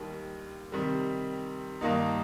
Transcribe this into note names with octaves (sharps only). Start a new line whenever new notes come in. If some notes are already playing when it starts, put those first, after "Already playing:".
Already playing: D#2 D#3 G3
C3 D#3 G3
G2 D#3 A#3 D#4